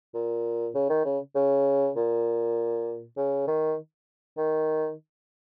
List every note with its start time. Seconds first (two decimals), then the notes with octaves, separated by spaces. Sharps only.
0.14 A#2
0.74 C#3
0.89 D#3
1.05 C#3
1.35 C#3
1.96 A#2
3.17 C#3
3.47 D#3
4.38 D#3